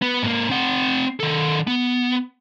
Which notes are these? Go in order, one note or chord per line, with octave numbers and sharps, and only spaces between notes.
B3
G#2 A#3
C4 F#5
D#3 A4
B3